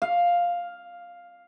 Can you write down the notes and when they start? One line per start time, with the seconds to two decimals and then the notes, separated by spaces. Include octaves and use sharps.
0.02 F5